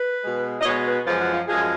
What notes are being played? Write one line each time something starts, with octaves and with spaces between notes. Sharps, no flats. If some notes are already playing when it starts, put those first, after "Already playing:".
Already playing: B4
B2 G#3
D#5
B2 G#3 C#5
B4
F#2 F3 G#3 G#4
F#4
F4
F#2 F3 G#3 G#4